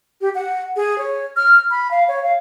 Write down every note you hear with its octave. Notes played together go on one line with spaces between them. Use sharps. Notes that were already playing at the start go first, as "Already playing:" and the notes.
G4
F#5
G#4
C#5
F6
B5
F5
C#5
F5